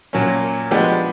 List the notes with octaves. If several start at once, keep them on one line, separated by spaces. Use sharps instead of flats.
A#2 F#3 A#3 C#4
F3 G#3 B3 D4 G4